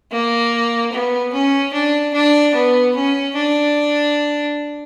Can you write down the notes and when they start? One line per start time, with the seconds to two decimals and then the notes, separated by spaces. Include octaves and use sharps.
0.12 A#3
0.92 B3
1.33 C#4
1.73 D4
2.13 D4
2.54 B3
2.95 C#4
3.35 D4